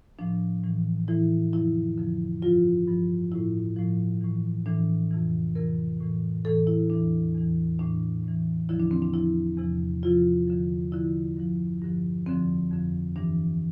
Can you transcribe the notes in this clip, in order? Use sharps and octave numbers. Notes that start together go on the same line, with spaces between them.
A2 F3 D4
A2 E3
A2 E3 E4
F2 D3 F3 E4
F2 D3 F3
G2 F3 F4
G2 F3
A2 F3 E4
A2 F3
A2 E3
A2 E3 D4
F2 C3 E3
F2 C3 E3 A#4
A2 E3
A2 E3 A4
E4
E2 E3 D4
E2 E3
A2 E3 D4
A2 E3
E2 D3 F3 E4
D4
C4
D4
E2 D3 F3 E4
E2 C3 F3
E2 C3 F3 F4
E2 D3 F3
E2 D3 F3 E4
G2 D3 F3
G2 D3 F3
F2 D3 F3 C4
F2 D3 F3
G2 E3 D4